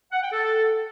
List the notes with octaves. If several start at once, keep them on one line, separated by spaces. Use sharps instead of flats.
F#5
G5
A4